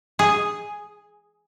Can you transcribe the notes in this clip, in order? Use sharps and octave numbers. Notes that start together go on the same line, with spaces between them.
G#4